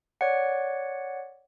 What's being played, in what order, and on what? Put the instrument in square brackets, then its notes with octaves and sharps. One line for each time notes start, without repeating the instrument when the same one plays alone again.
[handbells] C#5 D5 F#5